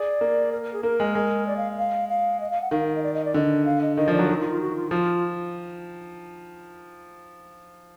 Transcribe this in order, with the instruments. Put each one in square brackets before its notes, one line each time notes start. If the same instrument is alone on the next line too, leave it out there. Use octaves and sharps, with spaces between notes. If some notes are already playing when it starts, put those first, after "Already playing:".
Already playing: [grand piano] G#4 [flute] D5
[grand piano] A#3
[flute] A#4
A#4
G#4
[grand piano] A#3 [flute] A#4
[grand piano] G#3
G#3
[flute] D5
F5
F5
F5
D#5
F5
F#5
[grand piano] D#3 [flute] F5
[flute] F5
D#5
D5
D#5
D5
[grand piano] D3 [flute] D#5
[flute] F5
D#5
[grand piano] D#3 [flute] D#5
[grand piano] F3
[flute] D5
[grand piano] F#3
[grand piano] D#3 [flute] D#4
[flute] F4
F4
F#4
F4
[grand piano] F3 [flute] F4